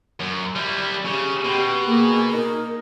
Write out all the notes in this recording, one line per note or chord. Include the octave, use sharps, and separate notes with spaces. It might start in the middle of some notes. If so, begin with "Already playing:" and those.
F#2
G3 E4
C#3 G4
B2 G5 C6
A#3 G#4
D#4 A#4